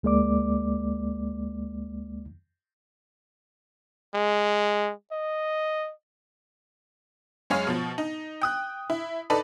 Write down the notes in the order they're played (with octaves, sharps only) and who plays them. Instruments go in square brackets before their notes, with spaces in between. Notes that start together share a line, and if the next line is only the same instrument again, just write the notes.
[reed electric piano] D2 G#3 A#3 D5 D6
[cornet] G#3
D#5
[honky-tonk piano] F#2 G#3 G#4 C#5 F5
B2 F3
D#4
G5 D#6 F#6
E4
D#4 A4 B4 D5